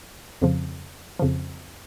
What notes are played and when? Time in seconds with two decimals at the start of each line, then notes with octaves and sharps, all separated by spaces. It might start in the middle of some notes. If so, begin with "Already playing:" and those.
0.42 F2 C#3 F3
1.19 F2 C#3 F3